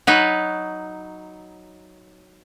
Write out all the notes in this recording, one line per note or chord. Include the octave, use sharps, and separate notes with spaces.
F#3 D#4 B4